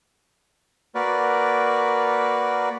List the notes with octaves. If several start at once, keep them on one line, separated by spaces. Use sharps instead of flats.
A#3 F#4 A#4 B4 D5